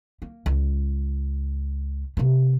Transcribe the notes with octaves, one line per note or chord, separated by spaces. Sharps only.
A#3
C#2
C3 A#3